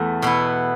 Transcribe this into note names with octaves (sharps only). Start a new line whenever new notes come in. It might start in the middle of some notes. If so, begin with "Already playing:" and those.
Already playing: E2 A3
B2 B3 E4